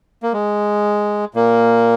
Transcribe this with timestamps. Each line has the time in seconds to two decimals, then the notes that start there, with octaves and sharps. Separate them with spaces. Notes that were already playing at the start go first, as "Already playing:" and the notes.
0.23 A#3
0.33 G#3
1.34 A#2 A#3